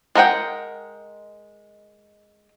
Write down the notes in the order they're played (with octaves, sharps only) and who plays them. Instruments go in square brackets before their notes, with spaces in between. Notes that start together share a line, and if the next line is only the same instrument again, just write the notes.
[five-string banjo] G#3 A#4 F#5 G5